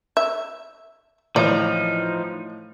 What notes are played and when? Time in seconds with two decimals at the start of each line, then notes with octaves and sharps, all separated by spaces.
0.17 E5
1.36 A2 E3 F3 D#4 D5